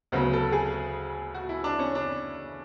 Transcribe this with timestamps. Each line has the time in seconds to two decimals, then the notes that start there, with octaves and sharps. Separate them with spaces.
0.12 D2 C#3 F#3 B3 F#4
0.33 A4
0.52 G#4
1.35 F#4
1.49 E4
1.64 D4
1.79 C#4
1.95 D4